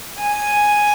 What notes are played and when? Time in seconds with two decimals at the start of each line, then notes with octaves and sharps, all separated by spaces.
0.21 G#5